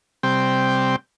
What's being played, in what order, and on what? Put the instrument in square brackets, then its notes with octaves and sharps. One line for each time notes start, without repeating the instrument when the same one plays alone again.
[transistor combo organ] C3 G3 C4 G5